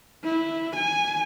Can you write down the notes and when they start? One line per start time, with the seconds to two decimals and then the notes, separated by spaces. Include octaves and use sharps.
0.24 E4
0.76 G#5